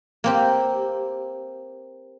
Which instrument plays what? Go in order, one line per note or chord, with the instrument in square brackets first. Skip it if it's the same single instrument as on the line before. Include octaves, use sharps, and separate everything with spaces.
[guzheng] A#3 C4 G4